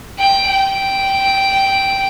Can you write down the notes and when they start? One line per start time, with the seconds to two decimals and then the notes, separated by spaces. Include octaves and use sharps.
0.18 G5
0.47 G5